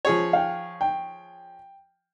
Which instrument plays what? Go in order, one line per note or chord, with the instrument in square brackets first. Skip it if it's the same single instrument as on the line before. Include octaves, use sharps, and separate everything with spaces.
[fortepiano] F3 G#4 C#5
[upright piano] F5 G5
G5